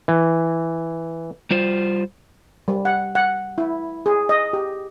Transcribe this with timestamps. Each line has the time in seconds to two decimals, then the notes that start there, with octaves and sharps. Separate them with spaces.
0.08 E3
1.51 G3 F4 C5
2.68 G3
2.85 F#5
3.15 F#5
3.58 E4
4.06 G#4
4.29 D#5
4.53 G4